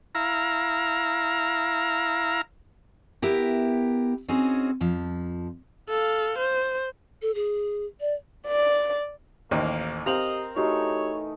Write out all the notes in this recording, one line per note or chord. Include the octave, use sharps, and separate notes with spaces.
E4 F5 A#5
B3 E4 G4 A#4
C4 C#4 D#4 F#4 G#4
F2 F3
A4 F5
C5
A4
G#4
D5
D5
A1 D#2 A#3 C5
C4 G4 A#4 D#5 F5 A#5 F7 F#7
E3 A3 D#4 F#4 G4 C#5